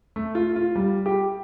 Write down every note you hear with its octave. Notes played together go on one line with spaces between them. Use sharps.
A3
F4
F4
G3
G4